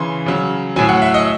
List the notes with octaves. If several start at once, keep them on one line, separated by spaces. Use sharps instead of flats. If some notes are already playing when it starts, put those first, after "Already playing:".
Already playing: C#3 E3 C6
C#3 F#3
A2 F#3 G#5
F#5
E5
D#5